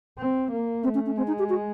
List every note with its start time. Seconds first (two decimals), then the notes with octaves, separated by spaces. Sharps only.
0.19 C4
0.51 A#3
0.84 A3 C4
0.95 C#4
1.06 C#4
1.17 G#3 C4
1.27 D#4
1.39 G4
1.49 F#4